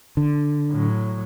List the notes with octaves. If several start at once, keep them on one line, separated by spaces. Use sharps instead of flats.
D3
A2 F#3